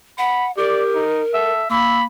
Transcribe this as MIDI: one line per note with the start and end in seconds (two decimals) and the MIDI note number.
0.18 0.52 78
0.18 0.47 83
0.57 1.04 67
0.57 1.51 70
0.57 0.83 74
0.94 1.22 63
1.34 1.64 69
1.34 1.70 76
1.70 2.06 58
1.70 2.04 83
1.70 1.98 88